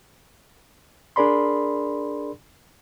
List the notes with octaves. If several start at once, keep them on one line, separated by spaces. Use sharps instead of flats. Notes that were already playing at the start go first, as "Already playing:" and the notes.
D4 G#4 A#4 D5 B5 C6